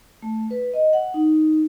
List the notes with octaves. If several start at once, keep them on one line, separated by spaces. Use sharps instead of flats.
A3
B4
D#5
F#5
D#4